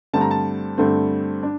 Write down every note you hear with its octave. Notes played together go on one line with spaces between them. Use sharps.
G2 D3 A3 C4 A5
A#5
A5
G2 D3 A3 C4
D4